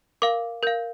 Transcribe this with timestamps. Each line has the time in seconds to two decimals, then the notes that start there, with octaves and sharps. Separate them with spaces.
0.22 A#4 F5 D6
0.63 A#4 F5 G6